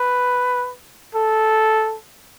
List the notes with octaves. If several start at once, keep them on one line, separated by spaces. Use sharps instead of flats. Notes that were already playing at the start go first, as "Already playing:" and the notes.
Already playing: B4
A4